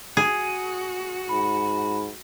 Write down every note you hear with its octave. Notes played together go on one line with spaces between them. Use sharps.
F#4 G#4
G#2 B5